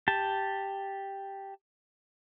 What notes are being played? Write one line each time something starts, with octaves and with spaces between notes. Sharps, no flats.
G4 A5